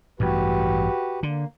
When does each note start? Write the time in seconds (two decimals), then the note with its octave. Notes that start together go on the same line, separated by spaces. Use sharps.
0.20 A1 G2 F#4 G4 B4
1.23 D3 A#3